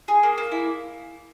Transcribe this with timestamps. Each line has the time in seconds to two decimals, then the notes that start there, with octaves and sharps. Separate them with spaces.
0.08 G#4
0.23 A#3
0.38 A#3
0.52 E4